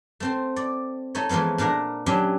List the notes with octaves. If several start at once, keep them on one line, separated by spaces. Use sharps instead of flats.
A3 C4 C5
D5
A3 D#4 C#5
E3 F3 G#3 A3 B3
A#2 D4 A#4 F#5 A#5
F#3 C#4 D4 E4 G4